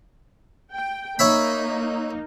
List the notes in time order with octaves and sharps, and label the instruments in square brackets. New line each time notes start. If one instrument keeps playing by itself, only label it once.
[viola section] G5
[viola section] A#3 D#4 [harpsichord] C#5 E5 B5